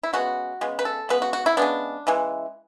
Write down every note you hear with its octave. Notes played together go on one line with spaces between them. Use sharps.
E4
C#3 G#3 B3 F#4
C#3 G#3 B3
B4
A4
C#3 G#3 B3 B4
F#4
F#4
E4
C#3 G#3 B3 D4
C#3 E3 G#3